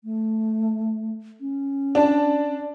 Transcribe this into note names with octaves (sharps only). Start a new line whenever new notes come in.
A3
C#4
D4 A5